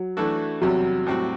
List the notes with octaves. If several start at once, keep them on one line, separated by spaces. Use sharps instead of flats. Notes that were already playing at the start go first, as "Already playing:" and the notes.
Already playing: F#3
E3 A3 D4 F#4 A4
E2 C3 F#3 G3
A2 G3 C4 F#4